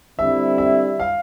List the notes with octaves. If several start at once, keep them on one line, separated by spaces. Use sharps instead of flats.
D3 G3 C4 E4 E5
E5
F5